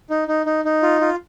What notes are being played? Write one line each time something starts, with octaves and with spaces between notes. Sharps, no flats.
D#4
D#4
D#4
D#4
F4
F4